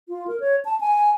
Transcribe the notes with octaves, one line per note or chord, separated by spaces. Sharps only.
F4
A#4
C#5
A5
G#5